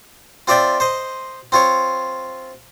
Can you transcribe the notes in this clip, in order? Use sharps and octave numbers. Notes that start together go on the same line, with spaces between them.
C4 F4 D5 E5 G5
C5 D#5
C4 F4 C#5